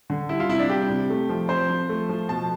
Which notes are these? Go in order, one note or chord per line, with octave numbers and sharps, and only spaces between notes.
D3
G3 E4
F4
C3 E4
D4
G3 G4
C3
A3
F3
C4 C5
F3
A3
F3
B2 A5